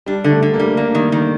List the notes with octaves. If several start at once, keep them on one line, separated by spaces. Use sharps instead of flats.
G3 D4
D3
A3
D3
A#3
G3
A#3 D4
D#3
D#3